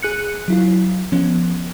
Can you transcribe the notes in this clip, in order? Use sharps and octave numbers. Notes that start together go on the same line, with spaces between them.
G#4 F#6 C#7
F#3 E4 F4
F3 B3 C#4